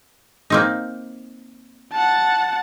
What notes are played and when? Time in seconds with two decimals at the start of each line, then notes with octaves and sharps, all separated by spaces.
0.50 A#3 C4 D#4
1.93 F#5 A5